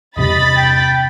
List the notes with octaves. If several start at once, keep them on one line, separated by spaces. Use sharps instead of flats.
E2 G2 C3 D#5 B5 A6
G5